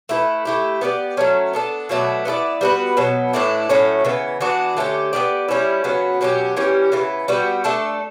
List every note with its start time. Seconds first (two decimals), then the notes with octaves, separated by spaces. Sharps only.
0.09 A3 E4 G4 B4
0.45 A3 E4 G4
0.81 B3 D4 G4 D5
1.17 F#3 A3 C#4
1.53 B3 D4 A4
1.89 B2 F#3 A3 D4
2.25 B3 E4 G4 D5
2.61 G3 B3 F#4 B4
2.97 B2 F#3 B3
3.33 A2 E3 A3 D4
3.69 A2 F#3 A3 C#4
4.05 C#3 E3 B3
4.41 E3 B3 D4 F#4
4.77 D3 A3 C#4 G4
5.13 B3 D4 G4 D5
5.48 G3 C#4 E4
5.84 C#3 F#3 B3 F#4
6.21 B2 F#3 C#4 G4
6.57 E3 G3 C#4 G4
6.92 C#3 E3 B3
7.28 G3 B3 F#4
7.64 A3 D4 A4